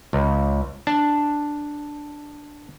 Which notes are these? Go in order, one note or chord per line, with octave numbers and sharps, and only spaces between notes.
C#2
D4 A5